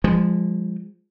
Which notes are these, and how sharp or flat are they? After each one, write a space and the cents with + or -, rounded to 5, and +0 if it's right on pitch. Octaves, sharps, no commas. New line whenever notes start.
F3 +0 G#3 -30